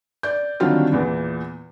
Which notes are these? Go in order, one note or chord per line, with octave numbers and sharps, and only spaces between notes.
D5 G6
D3 D#3 F#3 G3 C4 F4
E2 A#2 E3